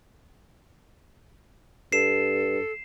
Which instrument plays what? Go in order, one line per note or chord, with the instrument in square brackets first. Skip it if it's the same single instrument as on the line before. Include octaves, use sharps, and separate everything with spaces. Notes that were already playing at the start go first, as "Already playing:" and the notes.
[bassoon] G2 [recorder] A4 [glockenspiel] C7 E7